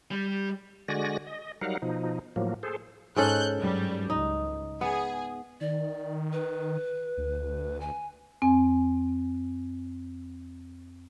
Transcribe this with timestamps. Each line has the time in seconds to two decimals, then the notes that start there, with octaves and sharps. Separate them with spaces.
0.11 G3
0.88 D3 G#3 F#4 D5 G#5 A#6
1.27 D#5
1.61 F#3 G3 D#4 A#4 F5 F#5
1.82 B2 F3 D#4
2.36 A2 F3 F#3 A#3
2.63 G#4 A4 C5
3.16 G#2 C#4 A4 F#6 G6
3.58 G2 F#3 G3
4.10 C#2 D#4
4.81 B3 G#4
5.61 D#3 D5
6.33 B4
7.17 D2
7.81 G#5
8.42 F2 C4 G#5